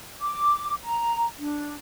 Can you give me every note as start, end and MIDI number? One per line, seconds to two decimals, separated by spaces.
0.20 0.73 86
0.83 1.25 82
1.37 1.73 62